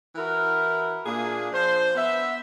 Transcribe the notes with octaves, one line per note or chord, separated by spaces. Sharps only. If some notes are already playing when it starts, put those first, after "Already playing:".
E3 E4 F#4 A#4
A#2 A#3 D4 G#4
F3 D4 C5
B3 E5